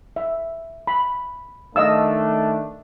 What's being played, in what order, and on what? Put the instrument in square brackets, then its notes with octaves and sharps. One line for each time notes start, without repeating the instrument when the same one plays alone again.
[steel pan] E5
B5
[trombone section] D#3 A3 D4 [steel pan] D#5 F5 E6